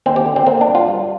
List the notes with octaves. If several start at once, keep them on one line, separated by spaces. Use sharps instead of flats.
D#2 C4
G4
D3
C4
A#3 C4
D4
G2
F4
G3